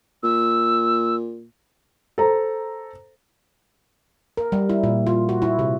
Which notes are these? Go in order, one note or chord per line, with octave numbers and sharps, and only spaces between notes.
A#2 E6
A4 C5 A#5
A#4
G3
E4
A#2
F4
F#4
E4
C3